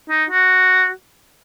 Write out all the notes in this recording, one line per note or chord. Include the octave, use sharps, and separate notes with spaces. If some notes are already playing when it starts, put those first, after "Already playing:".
D#4
F#4